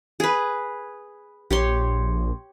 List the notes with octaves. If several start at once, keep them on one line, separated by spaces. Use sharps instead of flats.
G#4 B4
A#1 G4 C#5 C6